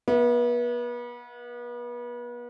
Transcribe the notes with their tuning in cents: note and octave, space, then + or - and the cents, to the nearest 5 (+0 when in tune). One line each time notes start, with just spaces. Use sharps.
B3 -35 E5 +0